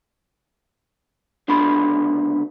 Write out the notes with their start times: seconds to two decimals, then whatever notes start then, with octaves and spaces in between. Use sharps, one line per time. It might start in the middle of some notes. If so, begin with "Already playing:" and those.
1.48 C#2 D3 B3 D4 B5 C6